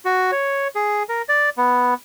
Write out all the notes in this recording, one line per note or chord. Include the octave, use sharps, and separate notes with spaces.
F#4
C#5
G#4
A#4
D5
B3